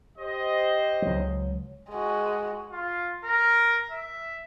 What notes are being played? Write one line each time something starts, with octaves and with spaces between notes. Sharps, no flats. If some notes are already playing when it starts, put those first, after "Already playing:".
G4 C5 D#5
C#2 F#3
G#3 F#4
F4
A#4
E5